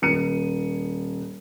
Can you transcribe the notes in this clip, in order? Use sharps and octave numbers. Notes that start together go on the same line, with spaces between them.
D#1 C#7 D#7